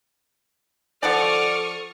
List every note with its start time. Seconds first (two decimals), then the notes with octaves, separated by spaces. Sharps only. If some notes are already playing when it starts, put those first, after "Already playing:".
1.03 F3 A4 D5 F#5 G5 C#6 D#6 F6